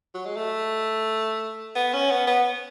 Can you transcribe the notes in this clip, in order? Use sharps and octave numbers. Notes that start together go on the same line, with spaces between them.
F#3
G#3
A3
B3
C#4
B3
B3